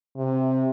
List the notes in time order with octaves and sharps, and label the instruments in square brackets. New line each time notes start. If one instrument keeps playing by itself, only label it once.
[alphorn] C3